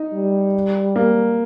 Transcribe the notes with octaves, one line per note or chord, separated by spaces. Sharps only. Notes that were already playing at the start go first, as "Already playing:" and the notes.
Already playing: D#4
G3
A#3